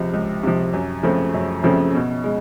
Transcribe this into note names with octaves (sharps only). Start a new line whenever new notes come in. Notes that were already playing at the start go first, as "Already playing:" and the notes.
Already playing: C#2 C3 F3
C#2
C3 F3
F#2
C#3 F3 A3 C4
F#2
C#3 F3 A3 C4
B2
G#3